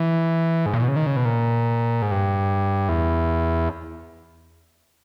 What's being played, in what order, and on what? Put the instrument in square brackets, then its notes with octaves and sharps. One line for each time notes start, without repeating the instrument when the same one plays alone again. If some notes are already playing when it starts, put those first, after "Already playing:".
Already playing: [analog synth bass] E3
G#2
A#2
B2
C#3
D#3
C#3
B2
A#2
G#2
G2
E2